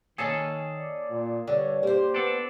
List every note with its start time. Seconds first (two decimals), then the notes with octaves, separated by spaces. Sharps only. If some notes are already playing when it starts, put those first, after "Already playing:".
0.18 D#3 A#3 C#4 G#4 A4
0.75 D5
1.10 A#2
1.47 G2 D3 C#5
1.83 A#3 G4 C5
2.14 B3 D4 A4